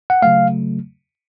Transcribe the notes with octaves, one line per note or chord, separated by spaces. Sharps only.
F#5
C#3 F#3 A3 F5